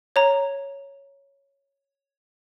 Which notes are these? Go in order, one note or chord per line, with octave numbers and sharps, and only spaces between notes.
C#5 A#5